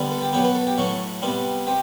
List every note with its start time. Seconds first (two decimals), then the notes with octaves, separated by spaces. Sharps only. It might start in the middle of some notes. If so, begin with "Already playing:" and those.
Already playing: D3 G3 B3
0.11 A4
0.22 G4
0.33 B2 F#3 B3 G4
0.44 B4
0.55 A4
0.67 G4
0.78 A2 F#3 A3 F#4
1.22 C3 G3 B3
1.67 C3 G4